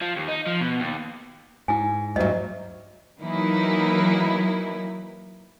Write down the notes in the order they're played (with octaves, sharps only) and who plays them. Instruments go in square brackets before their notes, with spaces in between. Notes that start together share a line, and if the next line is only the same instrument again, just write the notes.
[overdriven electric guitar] F3
D#2
D#4
F3
B2
D#2
[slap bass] G#2 [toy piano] E4 G#5
[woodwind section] D2 [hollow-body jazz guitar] G2 F#3 [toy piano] D#5
[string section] E3 F#3 A#3 D#4 E4